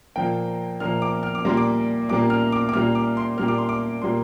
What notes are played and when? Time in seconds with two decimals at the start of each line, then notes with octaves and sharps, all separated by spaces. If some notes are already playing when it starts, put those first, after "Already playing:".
0.16 A#2 F3 A#3 G5
0.80 A#2 F3 A#3 F6
1.02 D6
1.23 F6
1.35 D6
1.45 A#2 G3 A#3 C6
1.57 D6
2.09 A#2 G3 A#3 D6
2.30 F6
2.52 D6
2.69 D6
2.74 A#2 G3 A#3 F6
2.95 D6
3.17 C6
3.37 A#2 G3 A#3 F6
3.48 D6
3.58 C6
3.69 D6
4.02 A#2 G3 A#3 C6